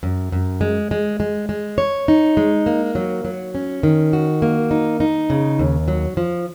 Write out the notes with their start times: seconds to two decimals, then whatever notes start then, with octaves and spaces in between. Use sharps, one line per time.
0.03 F#2
0.32 F#2
0.61 G#3
0.91 G#3
1.20 G#3
1.49 G#3
1.78 C#5
2.08 D#4
2.37 G#3
2.66 A#3
2.95 F#3
3.25 F#3
3.55 C#4
3.83 D#3
4.13 F#4
4.42 A#3
4.71 D#4
5.00 D#4
5.30 C#3
5.59 D#2
5.88 F#3
6.17 F3